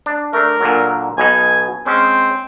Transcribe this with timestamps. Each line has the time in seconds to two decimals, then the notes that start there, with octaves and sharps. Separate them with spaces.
0.06 D4
0.33 A3 D4 A#4
0.61 A#2 D3 F#3
1.18 B1 B2 D#4 G#5
1.86 G#3 C4 C#4